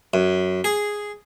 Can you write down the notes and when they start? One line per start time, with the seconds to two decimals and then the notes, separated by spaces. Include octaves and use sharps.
0.14 F#2
0.64 G#4